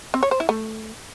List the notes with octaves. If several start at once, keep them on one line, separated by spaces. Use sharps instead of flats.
C4
C#5
C5
E4
A3